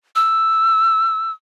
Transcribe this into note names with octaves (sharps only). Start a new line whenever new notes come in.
E6